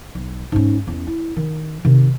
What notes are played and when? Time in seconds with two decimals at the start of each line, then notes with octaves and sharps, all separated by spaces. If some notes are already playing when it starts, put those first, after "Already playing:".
0.15 B1
0.52 G#2 C#4
0.87 E2 C#4
1.07 E4
1.36 D#3
1.85 C3 D#3